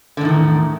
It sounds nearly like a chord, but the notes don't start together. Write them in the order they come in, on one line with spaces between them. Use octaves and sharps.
D3 A2 D#3 E2